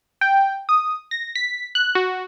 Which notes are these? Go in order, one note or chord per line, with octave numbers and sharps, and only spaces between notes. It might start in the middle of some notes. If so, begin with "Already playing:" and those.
G5
D#6
A#6
B6
F#6
F#4